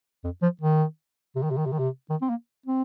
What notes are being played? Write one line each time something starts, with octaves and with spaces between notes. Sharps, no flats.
F2
F3
D#3
C3
D#3
C3
D#3
C3
D#3
C3
D#3
C4
A#3
C4